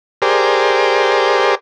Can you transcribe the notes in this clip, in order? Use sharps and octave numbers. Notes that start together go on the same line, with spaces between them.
G4 G#4 A#4 C5 D5